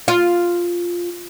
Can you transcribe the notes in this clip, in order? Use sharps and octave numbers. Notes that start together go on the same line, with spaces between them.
F4